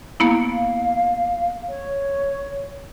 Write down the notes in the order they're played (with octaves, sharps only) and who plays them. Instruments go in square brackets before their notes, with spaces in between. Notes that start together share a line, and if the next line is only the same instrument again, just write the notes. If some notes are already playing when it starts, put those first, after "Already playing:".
[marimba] A#3 B3 E4 [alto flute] F5
[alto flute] C#5